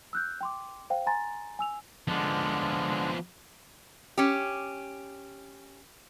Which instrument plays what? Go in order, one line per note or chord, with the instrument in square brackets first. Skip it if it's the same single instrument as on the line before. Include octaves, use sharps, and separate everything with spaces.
[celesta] E6 F#6 G6
G5 C6 D6
C5 F5 G5
G#5 A#5 C6 A6
G#5 E6 F7
[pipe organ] D3 G#3 D4 [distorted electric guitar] F3 B3
[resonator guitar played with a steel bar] C#4 G4